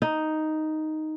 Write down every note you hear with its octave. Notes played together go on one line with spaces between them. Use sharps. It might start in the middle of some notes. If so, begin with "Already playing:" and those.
D#4